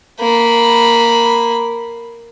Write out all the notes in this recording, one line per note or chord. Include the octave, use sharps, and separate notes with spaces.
A#3 B5